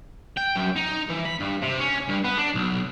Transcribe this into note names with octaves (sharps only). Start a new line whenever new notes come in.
G5
F#2
D#4
E3
B5
G2
C3
C#4
G2
B3
D4
B1